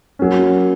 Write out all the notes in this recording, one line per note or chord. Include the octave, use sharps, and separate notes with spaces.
F#3 A#3 C#4